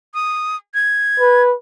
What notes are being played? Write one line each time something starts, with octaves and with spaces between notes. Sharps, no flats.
D#6
G#6
B4